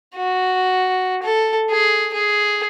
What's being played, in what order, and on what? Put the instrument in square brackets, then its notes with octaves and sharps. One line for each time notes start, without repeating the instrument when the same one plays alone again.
[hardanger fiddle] F#4
A4
G#4
G#4